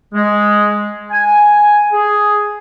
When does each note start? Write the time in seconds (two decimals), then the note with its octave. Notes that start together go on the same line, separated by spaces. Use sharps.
0.14 G#3
1.11 G#5
1.93 G#4